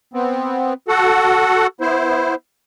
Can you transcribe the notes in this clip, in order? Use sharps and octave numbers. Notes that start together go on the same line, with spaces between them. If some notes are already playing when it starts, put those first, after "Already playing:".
B3 C4
F#4 A4 F#5
B3 E4 C5